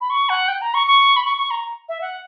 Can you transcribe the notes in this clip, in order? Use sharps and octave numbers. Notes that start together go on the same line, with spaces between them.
B5
C#6
F#5
G5
A#5
C#6
C#6
B5
C#6
C#6
A#5
E5
F#5